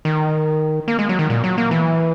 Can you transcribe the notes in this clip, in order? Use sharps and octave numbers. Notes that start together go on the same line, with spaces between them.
D#3
A#3
G#3
F#3
D#3
A#2
F#3
A#3
E3